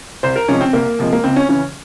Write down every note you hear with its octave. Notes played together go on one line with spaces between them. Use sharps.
C2 C5
A#4
C3 F3 G#3 C#4
C4
C2 A#3
C3 F3 G#3
A#3
C#2 C4
C#4
C#3 E3 C#4